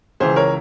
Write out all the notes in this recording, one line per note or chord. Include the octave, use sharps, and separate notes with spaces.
C#2 C#3 E3 G#4 C5
A#4 C#5